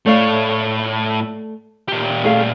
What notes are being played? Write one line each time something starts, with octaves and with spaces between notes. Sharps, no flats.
A2 A3 C#5 D5 F5
A#2 G4
A3 G#4 F5